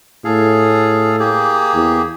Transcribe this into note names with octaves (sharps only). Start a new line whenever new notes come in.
A2 G#4 A4 F5
A#3 G4 G#4
E2